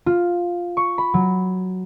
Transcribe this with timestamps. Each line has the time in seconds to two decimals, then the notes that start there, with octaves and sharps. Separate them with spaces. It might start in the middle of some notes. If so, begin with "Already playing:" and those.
0.06 F4
0.77 C#6
0.98 B5
1.14 F#3